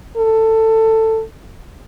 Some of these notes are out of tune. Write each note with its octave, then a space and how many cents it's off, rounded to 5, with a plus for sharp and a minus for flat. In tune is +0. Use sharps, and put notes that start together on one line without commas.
A4 +15